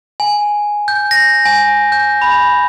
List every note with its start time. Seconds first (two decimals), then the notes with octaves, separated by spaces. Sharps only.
0.20 G#5
0.88 G6
1.11 A#6
1.45 G#5
1.92 G6
2.22 B5